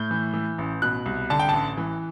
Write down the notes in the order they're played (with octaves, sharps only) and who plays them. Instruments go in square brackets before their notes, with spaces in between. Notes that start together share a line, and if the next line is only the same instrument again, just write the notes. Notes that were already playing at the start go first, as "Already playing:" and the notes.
Already playing: [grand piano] A2 G6
E3
E3
A1
B2 F#6
C2
D3 A5
G5
A1 A5
E3